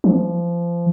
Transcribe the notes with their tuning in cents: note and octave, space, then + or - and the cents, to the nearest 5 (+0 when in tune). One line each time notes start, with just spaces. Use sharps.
F3 -25